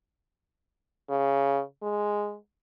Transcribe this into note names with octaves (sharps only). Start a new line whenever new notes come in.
C#3
G#3